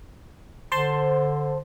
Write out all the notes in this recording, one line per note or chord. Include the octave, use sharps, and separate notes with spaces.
D3 C5 A5 C6